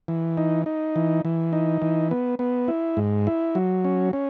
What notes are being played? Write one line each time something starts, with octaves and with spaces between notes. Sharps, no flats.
E3
D#4
D#4
E3
E3
D#4
E3
B3
B3
E4
G#2
E4
F#3
C#4
C#4